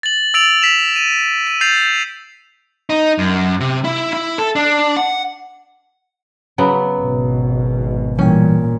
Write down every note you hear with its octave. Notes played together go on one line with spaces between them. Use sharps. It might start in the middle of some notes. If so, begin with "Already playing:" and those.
A6 F#7
E6 A6 D7 F7 F#7
B6 E7 F7
D#7
D#7
G6 A6 C7 F7
D#4
F#2
C3
E4
E4
A4
D4
F#5
C#3 F#3 B3
G#1 B2
A#2 E3 G3 C#4 G5